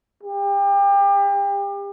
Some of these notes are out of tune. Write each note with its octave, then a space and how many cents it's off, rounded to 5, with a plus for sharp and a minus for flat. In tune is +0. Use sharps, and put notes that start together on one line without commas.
G4 +30